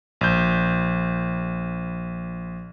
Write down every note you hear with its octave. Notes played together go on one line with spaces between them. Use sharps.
A#1 G6